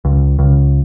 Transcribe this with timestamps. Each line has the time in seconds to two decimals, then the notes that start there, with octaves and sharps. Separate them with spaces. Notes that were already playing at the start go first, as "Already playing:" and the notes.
0.05 C#2
0.39 C#2